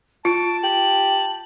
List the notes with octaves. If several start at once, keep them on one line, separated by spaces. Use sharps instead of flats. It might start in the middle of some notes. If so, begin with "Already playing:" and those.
F4 A5 D7
G4 F#7